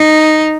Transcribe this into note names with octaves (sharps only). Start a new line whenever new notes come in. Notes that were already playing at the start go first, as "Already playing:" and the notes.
Already playing: D#4